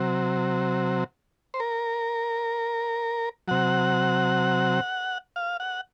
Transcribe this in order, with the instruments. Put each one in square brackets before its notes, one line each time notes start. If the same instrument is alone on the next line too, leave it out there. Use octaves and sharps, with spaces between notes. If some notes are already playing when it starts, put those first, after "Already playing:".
Already playing: [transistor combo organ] C3 F#3
C5
A#4
C3 F#3 F#5
F5
F#5